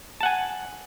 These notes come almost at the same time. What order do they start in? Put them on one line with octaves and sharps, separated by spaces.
A5 F#5 G#5